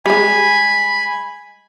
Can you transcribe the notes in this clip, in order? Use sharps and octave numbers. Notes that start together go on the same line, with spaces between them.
G3 G#3 G#5 B5